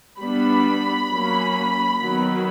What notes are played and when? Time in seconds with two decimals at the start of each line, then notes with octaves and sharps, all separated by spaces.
0.20 G3 B3 D4 B5
1.11 F#3 A#3 C#4
2.02 D#3 F#3 B3